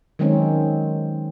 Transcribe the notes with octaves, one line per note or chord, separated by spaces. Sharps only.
D#3 F#3 G#3 C4 C#4 D#4